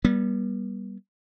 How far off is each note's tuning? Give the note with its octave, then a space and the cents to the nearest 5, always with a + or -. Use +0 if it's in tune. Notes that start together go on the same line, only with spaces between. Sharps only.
G3 +0 B3 -40